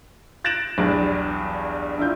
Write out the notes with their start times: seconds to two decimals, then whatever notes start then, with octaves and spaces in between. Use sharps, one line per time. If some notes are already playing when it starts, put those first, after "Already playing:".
0.44 F#6 A6 A#6 D7 E7 F#7
0.78 B1 E2 G2
1.97 A#1 E4 F4 G6